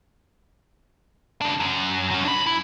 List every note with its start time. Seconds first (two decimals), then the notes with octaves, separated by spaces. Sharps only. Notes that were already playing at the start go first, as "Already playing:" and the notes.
1.41 C#3 D4
1.60 F#2
2.11 F#3 C#4
2.25 D4 B5
2.46 E4